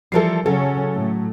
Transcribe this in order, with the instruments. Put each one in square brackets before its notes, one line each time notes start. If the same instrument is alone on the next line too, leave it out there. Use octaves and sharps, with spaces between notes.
[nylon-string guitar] E3 F3 G3 [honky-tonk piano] A4 A#4 C7
[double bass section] C#3 C#4 [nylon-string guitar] F#3 [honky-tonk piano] A4
[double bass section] A2 A3